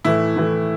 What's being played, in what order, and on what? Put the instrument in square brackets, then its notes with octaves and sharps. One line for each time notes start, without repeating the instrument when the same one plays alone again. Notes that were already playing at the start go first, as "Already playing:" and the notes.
[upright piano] A2 E3 A3 [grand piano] E4
[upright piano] A2 E3 A3